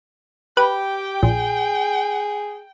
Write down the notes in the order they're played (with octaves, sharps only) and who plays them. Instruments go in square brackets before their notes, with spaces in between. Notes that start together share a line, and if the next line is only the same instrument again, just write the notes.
[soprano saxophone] G4 [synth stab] B4 [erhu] G5
[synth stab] A#1 [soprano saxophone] G#4